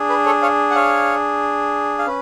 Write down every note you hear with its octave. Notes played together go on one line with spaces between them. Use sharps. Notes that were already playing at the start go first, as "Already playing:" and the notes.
Already playing: D4 G#4
B4
A4 C#5
C#5 F5
F#5
C#5 F5
F5
C#4 B4